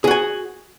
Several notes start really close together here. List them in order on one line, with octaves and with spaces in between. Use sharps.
G#4 F#4 G#5